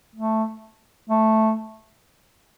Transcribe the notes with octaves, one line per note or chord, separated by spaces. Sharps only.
A3
A3